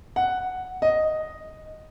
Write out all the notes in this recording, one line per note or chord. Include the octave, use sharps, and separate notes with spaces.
F#5
D#5